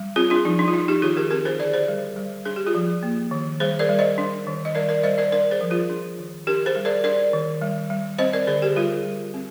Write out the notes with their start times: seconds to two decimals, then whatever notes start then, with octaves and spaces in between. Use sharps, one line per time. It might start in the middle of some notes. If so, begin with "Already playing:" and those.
Already playing: G3
0.16 C4 F4 G#4
0.30 D4 F4
0.45 F3 D#4
0.59 D4
0.68 F4
0.73 D4 D#4
0.88 D#4 G4
1.02 D#3 F4 G#4
1.17 G4 A#4
1.30 C4 G4 A#4
1.45 G#4 C5
1.59 D3 A#4 D5
1.74 G#4 C5
1.88 G3
2.16 G3
2.45 D4 G#4
2.56 G4
2.67 F4 G#4
2.75 F3
3.03 A#3
3.31 D#3
3.60 G3 G#4 C5
3.79 A#4 D5
3.89 G3
3.99 C5 D#5
4.18 D4
4.47 D#3
4.65 D#5
4.75 G3 A#4 D5
4.89 A#4 D5
5.03 G3 C5 D#5
5.18 A#4 D5
5.32 D4 A#4 D5
5.51 G#4 C5
5.61 F3
5.70 F4 G#4
5.89 D4
6.18 D#3
6.47 D4 G4 A#4
6.66 G#4 C5
6.76 G3
6.85 A#4 D5
7.04 D4 A#4 D5
7.33 D#3
7.61 G3
7.90 G3
8.19 C4 C5 D#5
8.33 A#4 D5
8.47 D3 G#4 C5
8.62 G4 A#4
8.76 G3 F4 G#4
9.05 G3
9.34 C4